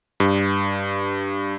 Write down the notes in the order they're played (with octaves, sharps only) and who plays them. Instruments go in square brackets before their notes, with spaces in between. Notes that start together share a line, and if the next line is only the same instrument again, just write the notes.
[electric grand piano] G2